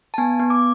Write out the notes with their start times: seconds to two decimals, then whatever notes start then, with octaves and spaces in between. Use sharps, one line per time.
0.14 A5
0.18 B3 G#5
0.40 B3
0.50 D6